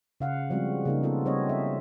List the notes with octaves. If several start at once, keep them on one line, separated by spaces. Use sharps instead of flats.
C#3 F5 F#5
F3 G3 G#3 C4 F#4
C#3 A#3 D#4
B3 F4 A4
G3 C4 C#5 D#5
A4 E5